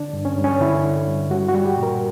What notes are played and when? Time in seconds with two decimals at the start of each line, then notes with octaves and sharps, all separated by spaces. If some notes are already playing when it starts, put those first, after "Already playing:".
Already playing: D3 D4
0.13 G2
0.25 C#4
0.38 G2
0.44 C#4
0.61 D3 E4
0.84 D3
1.07 G2
1.30 G3 F#4
1.48 F#4
1.54 G3
1.65 G4
1.77 A#2
1.83 A#4